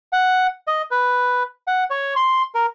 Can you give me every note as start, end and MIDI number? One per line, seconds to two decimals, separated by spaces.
0.13 0.47 78
0.67 0.82 75
0.91 1.43 71
1.67 1.84 78
1.90 2.14 73
2.16 2.42 84
2.55 2.66 70